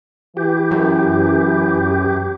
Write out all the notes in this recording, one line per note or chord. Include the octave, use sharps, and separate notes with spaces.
E3 G4
F#2